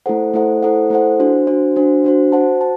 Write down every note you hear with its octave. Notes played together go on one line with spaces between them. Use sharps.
A3 E4 A4 C5 F#5
A3 E4 A4 C5 F#5
A3 E4 A4 C5 F#5
A3 E4 A4 C5 F#5
D4 F#4 C5
D4 F#4 C5
D4 F#4 C5
D4 F#4 C5
F#4 C5 F#5 A5
A5